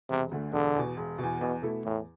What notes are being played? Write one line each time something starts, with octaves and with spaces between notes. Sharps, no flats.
E1 C3
D2 D3 A3
E1 D3
E2 B2
E1
E2 B2
E2 B2
B2 A3 E4 A4
E2 A2